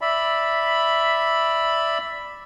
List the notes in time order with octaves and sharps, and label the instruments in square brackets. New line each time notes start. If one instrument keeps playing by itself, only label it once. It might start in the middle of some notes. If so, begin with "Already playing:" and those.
[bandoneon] D5 E5 B5